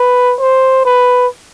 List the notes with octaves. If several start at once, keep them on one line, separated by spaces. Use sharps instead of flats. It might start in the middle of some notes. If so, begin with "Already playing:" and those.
Already playing: B4
C5
B4